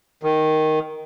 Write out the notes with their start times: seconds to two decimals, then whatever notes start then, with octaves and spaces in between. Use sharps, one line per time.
0.23 D#3